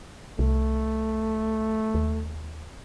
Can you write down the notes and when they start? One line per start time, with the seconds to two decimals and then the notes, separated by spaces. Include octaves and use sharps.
0.39 C2 A3
1.94 D#2